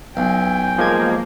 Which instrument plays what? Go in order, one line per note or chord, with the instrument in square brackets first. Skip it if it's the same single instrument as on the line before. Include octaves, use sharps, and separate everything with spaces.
[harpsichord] B1 [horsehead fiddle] G5 G#5
[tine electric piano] F3 G#3 G#6 [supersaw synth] A#3